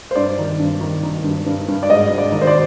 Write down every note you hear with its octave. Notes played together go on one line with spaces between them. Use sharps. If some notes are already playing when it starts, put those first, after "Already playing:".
C5
G2 D5
D#3
G2
D#3
D#3
G2
G2
G2
D5
G#2 D#5
G#2
D5
D#3
C5
D5